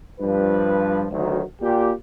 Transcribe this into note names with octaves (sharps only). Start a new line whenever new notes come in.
G2 F3 B4
D2 D#3 F#3
A#2 G4